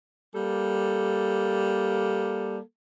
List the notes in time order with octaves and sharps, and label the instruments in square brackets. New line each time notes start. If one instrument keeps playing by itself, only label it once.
[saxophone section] G3 A#3 A4